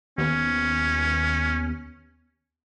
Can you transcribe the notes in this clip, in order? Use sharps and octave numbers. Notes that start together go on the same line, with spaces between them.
D#2 B3 C#4